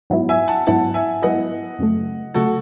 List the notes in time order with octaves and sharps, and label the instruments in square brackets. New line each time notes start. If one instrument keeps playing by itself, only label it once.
[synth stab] G#2 F#3 B3 E4
[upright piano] E5 G#5
F#5 A5
[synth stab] G#2 F#3 B3 E4 [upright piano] F#5 A5
[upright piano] E5 G#5
[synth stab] G#2 F#3 B3 E4 [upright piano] D#5 F#5
[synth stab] F#2 C#3 F#3 A3
[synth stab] C#3 F#3 A3 [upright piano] F#4 A4